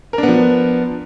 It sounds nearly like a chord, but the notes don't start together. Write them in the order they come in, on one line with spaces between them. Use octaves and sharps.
A#4 D4 B3 F3